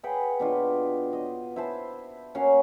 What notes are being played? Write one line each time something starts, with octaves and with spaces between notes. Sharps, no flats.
G#4 B4 F#5 G5
B2 D4 F4
D#5
E4 C5 A5
A#3 C#4 F#4 F5